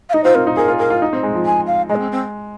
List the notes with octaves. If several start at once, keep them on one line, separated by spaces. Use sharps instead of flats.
F5
D#4 D#5
F4 C5
C4 A#4
D#4
G#4 A#4
F4
G#4 A#4
F4
D#4
C4
G#3
F3
G#5
F5
G#3 D#5
A#3
C4
C4